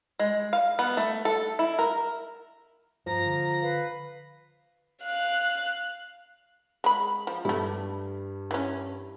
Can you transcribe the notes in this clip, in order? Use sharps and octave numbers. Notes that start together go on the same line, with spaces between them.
G#3
F5
B3
A3
A4
E4
A#4
G2 F3 A#5 A#6
D3
B4 F5
F5 F#6
G#3 B5
F3
G2 G3 A3 E4
E3 C#4